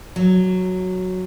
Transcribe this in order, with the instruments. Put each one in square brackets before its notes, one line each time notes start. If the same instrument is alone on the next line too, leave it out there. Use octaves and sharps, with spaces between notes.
[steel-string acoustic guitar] F#3